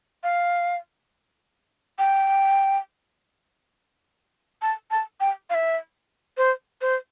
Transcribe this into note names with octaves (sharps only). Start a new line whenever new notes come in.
F5
G5
A5
A5
G5
F5
E5
C5
C5